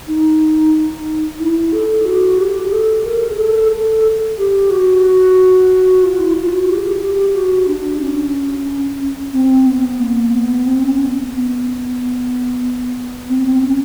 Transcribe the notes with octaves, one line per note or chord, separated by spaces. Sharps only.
D#4
E4
A4
F#4
G4
A4
A#4
G#4
A4
A4
G4
F#4
F4
E4
F4
F#4
G4
G#4
G4
G4
F#4
D4
C#4
C4
B3
A#3
B3
C4
C#4
B3
B3
B3
C4
C#4